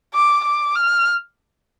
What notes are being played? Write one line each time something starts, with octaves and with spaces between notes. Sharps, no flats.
D6
D6
F6